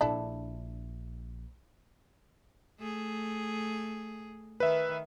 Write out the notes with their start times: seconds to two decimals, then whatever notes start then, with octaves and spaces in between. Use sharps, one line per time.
0.01 A#1 D4 E4 A4
2.79 A3 G#4
4.60 D#3 B4 E5